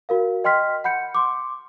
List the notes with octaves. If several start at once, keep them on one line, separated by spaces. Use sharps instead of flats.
F#4 A#4 F5
D#5 G5 C6 F6 B6
F#5 B5 G6 C#7
C6 D6